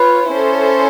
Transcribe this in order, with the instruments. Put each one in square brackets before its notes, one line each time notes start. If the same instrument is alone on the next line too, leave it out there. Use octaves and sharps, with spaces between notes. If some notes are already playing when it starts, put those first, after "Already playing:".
Already playing: [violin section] F4 C#5 [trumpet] B4
[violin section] C#4 E4 A4 C5